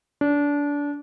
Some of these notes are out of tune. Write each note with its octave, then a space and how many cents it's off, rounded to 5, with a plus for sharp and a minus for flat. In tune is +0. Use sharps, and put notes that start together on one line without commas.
D4 -25